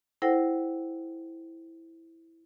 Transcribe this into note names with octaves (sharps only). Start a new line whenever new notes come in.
E4 A4 C5 F#5 G5 A#6